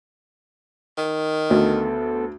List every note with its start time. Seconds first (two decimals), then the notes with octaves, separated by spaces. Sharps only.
0.98 D#3
1.50 D2 B3 A4